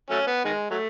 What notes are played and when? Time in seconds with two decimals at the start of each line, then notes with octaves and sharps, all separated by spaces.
0.10 F#3 A3 C#4
0.27 B3
0.44 D#3 G#3
0.71 F#3 A3